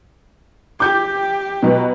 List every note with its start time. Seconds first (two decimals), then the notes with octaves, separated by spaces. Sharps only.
0.80 G4 G5 D6 G6
1.63 B2 F#3 B3